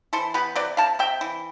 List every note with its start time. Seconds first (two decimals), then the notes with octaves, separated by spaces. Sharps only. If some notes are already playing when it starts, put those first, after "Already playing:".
0.13 E3 A4 C5
0.34 B3 G4 B4
0.56 C3 B4 D5
0.77 C3 F5 A5
0.99 C3 E5 G5
1.21 E3